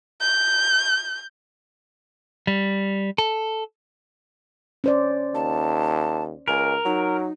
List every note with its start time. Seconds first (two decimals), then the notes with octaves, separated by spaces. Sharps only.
0.21 G6
2.47 G3
3.18 A4
4.84 C#4 C5 D5
5.35 D#2 A5
6.48 C#2 A#4 G#5
6.85 F#3 D#4